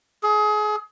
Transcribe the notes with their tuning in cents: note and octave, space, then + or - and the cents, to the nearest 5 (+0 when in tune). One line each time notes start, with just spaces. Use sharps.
G#4 +30